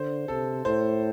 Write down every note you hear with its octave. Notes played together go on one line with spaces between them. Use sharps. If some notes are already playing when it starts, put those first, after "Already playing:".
Already playing: D3 C5
C3 A4
A2 C5